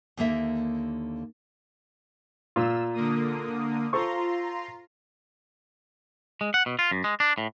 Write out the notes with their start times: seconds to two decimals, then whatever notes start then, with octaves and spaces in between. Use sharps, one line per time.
0.17 D#2 D3 A#3 E5
2.56 A#2 F4 E6
2.93 D3 A#3 D#6
3.93 F4 A4 C5 A#5 C6 C#6
6.41 G#3
6.54 F#5
6.66 B2
6.79 F4
6.91 F#2
7.04 G#3
7.20 D4
7.38 A2